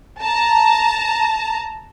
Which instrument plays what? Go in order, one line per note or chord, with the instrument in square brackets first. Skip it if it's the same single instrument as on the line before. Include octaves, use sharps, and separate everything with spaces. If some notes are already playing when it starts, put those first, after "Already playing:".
[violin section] A5 A#5